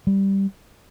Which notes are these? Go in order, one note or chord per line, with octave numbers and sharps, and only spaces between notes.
G3